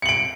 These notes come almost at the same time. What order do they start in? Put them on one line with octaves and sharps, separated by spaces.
C#7 F#7 D7